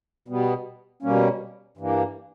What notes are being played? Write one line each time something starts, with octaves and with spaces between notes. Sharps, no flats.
B2 G3 B3
B2 G3 A#3 C#4
G2 E3 A#3